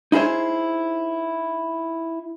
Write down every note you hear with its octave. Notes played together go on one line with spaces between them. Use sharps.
D#4 E4 G#4 C5 C#5